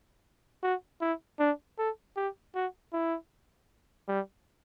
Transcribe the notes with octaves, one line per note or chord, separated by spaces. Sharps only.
F#4
E4
D4
A4
G4
F#4
E4
G3